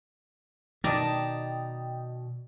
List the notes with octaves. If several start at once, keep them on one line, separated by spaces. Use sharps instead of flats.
B2 D#3 D5 D#5 G5 A5 A#5